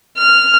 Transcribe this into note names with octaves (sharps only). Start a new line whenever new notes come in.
F6